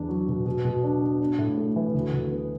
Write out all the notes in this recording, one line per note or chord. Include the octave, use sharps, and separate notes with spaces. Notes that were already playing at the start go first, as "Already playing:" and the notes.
Already playing: E2 D4
F#3
B2
B2
B2
D4
B3
D4
A2
A3
E3
D2
D2
B3